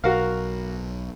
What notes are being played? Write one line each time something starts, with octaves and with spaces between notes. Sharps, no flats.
B1 F#4 A#4 F5